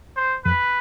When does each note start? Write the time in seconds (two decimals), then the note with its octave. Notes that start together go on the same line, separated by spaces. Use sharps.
0.17 C5
0.45 F2 B4